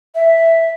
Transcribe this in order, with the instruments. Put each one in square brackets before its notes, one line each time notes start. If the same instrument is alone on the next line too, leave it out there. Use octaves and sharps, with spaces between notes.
[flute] E5